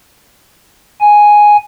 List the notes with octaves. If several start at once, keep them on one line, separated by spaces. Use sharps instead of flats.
G#5